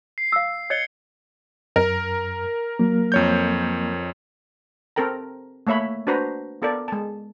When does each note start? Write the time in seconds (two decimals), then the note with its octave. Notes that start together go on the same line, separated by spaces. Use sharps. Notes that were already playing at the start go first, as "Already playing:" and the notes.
0.18 C7
0.32 F5 E6
0.70 C#5 D#5 G#6 C#7 G7
1.76 F#2 A#4
2.79 F#3 A#3
3.12 F2 C#5 G6
4.96 C4 A4 A#4 G5 A#5
5.67 A3 A#3 C#5 E5 B5
6.07 D4 F#4 B4 C5 A#5
6.62 B3 F4 A4 A#4 D5
6.88 G#3 A5